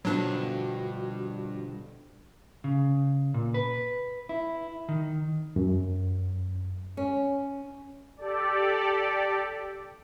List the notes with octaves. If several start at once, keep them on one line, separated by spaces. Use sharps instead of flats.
G2 B2 D3 F3 F#3 D4 F#4
C#3
A#2
B4
E4
D#3
F#2
C#4
G4 A4 D5